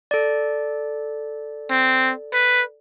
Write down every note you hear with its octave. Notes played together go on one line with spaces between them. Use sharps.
A4 D5
C4
B4